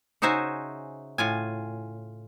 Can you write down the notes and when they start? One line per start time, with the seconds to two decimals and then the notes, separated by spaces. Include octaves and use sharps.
0.22 C#3 D#4 F#4 C5 E5 G#5
1.18 A2 F4 G#5